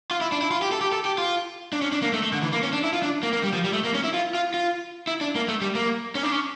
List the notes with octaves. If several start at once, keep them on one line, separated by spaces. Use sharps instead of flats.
F4
E4
D4
E4
F4
G4
A4
G4
A4
G4
F4
D4
C#4
D4
A#3
A3
A3
D3
E3
A#3
C#4
D4
E4
F4
D4
A#3
A#3
G3
F3
G3
A3
A#3
C#4
E4
F4
F4
F4
E4
D4
A#3
A3
G3
A#3
C#4
D4
C#4